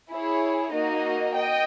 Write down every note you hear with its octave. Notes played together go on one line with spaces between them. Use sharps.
E4 G#4 C#5
A#3 D#4 F#4 A#4 D#5
D#5 G5